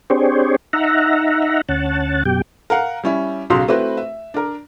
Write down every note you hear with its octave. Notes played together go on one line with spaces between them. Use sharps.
C4 D4 G4 G#4 C5 C#5
D#4 E5 F#5 A#5
D2 C#4 F#5 A5
F#2 B2 G4 G5
A#4 F5 F#5
G3 C#4 E4
B1 C#3 F#3 F#4 F5 C6
A3 C4 E4 F#4 B4
E5
D4 A#4